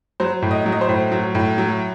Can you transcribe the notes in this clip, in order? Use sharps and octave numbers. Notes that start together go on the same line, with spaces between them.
F#3 C5
A2
D#5
F#3
D#5
C5
A2
F#3
A2
F#3